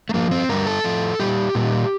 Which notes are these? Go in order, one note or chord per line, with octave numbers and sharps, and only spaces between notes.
A3
G2 F3 A#3
C4
G2 D3 G3 A#4
A4
A2 F3
A#2 G3 G4
A#2 G3